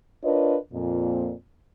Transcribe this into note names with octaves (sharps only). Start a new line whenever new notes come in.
D4 F4 A#4 B4 C#5 D#5
F2 A#2